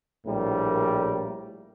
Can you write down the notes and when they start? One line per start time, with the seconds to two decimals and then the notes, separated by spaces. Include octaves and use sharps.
0.26 A#1 A2 G3 A#4